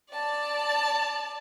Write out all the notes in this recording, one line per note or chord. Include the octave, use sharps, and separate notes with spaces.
D5 A5